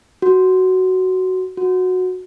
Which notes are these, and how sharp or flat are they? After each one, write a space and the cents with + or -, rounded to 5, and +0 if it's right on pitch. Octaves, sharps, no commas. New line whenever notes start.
F#4 +10
F#4 -10